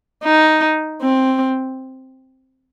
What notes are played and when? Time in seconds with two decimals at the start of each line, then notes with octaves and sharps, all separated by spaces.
0.24 D#4
1.02 C4